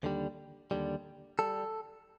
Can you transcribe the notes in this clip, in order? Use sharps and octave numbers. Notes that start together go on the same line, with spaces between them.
D#2 D3 G3
D#2 D3 G3
G3 A4